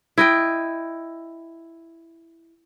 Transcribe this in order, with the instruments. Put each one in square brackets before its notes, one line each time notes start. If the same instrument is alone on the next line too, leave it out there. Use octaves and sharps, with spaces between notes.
[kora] E4 D#5 G5